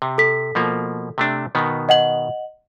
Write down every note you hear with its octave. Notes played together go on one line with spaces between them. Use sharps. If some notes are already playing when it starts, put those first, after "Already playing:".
C3
A4 B6
B2 F3 A#3
C3 A3 D4
B2 D#3 B3
D#5 F#5 F#7